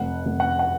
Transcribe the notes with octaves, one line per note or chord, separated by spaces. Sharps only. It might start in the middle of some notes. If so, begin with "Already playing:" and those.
Already playing: F1 F#5
F1
F#5
F#5